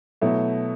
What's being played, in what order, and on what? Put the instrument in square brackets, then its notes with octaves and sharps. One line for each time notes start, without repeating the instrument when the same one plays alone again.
[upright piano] B2 F#3 A3 E4